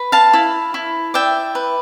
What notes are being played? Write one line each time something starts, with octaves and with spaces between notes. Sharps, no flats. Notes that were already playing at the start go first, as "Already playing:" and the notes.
Already playing: B4
F5 A5
E4
E4
D5 E5 G5
B4